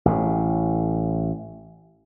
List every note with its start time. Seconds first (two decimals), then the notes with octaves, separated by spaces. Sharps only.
0.05 A1 A2